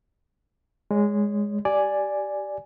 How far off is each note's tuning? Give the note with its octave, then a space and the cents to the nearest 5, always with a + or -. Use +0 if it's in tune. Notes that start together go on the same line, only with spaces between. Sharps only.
G#3 -10 C#5 +25
G4 -20 D5 +0 G#5 +0